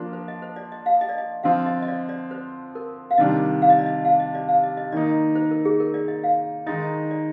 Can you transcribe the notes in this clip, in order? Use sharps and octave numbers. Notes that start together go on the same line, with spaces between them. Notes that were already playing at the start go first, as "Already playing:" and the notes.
Already playing: F3 A#3 D4 F4
C5
D#5
C5
D5
D#5
F5
D#5
D5
D#5
D3 F3 C4 F4 F5
D#5
D#5
D5
D5
C5
A#4
F5
C3 D#3 G3 D4 D#5
F5
D#5
D5
D#5
F5
D#5
D5
F5
D#5
D#5
D#3 A#3 D#4 D5
C5
A#4
G#4
A#4
D5
D#5
F5
D#3 G#3 D#4 D#5
D5